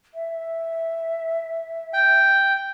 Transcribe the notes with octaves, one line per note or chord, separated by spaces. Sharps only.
E5
G5